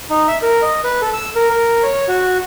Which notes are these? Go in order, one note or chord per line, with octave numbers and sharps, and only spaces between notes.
D#4
E5
A#4
D#5
B4
A4
E6
A#4
A#4
C#5
F#4